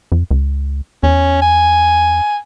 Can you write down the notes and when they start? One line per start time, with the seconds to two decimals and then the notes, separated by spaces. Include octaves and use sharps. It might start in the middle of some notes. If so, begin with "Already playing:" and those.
0.12 F2
0.31 C#2
1.03 E2 C#4
1.42 G#5